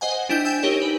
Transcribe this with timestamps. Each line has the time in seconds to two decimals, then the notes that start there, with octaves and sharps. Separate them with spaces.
0.01 C5 D#5 F#5 G#5
0.29 D4 E4 G5 G6
0.45 G5 G#5 E6 E7
0.63 D#4 G4 A#4 C#5
0.82 B4